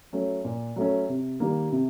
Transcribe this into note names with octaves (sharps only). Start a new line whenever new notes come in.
F#3 A3 C#4
A#2
F#3 A3 C#4
C3
D#3 G3 A#3
C3